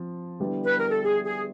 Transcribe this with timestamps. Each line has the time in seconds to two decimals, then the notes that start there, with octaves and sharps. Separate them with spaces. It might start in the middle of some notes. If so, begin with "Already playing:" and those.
Already playing: F3 C4
0.40 D3 G3 B3 E4
0.65 B4
0.78 A#4
0.91 A4
1.04 G#4
1.26 G#4